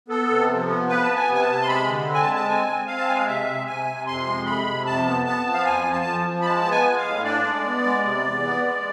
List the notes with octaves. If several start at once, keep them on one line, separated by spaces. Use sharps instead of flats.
B3 A4
C3
F3
B3
B3 B4
A5
B3
G#5
C3
G#5
A5
C3
C6
G#3 B5
D3
C4
G#5
A5
G#3
A5
C4 G#5
C4
C4 F5
A5
G#3 G#5
F5
C3 E5
C3
C3 G#5
C3
F2 C6
G#3
C3 B5
C3
F2 A5
B3
B3 A5
F3
F5
F2 G#5
F3
A5
F3
F3
B5
G#3 A5
B3
G#5
G#3
F5
A2
D4 D5
G#3
B3
G#3
C3
E2
B3
G#3